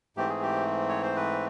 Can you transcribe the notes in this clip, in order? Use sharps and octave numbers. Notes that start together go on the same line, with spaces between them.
G#2 E3 A3 C4 G4
G#4
G4
C#5
C5
B4